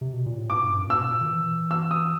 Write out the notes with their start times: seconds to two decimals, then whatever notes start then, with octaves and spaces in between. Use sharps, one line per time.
0.01 C3
0.13 B2
0.26 A#2
0.38 A2
0.50 G#2 D6
0.64 G2
0.77 F#2
0.87 A#2
0.90 A2 E6
1.01 B2
1.10 A#2
1.21 D#3
1.30 E3
1.71 E6
1.91 D#6